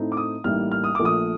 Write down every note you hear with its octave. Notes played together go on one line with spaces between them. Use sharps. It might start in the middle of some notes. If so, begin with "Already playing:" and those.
Already playing: A2 A3 C4 D#4
D6
D#6
A1 A2 G3 A#3 D#4 F6
F6
D#6
A#1 A#2 A3 D6
D#6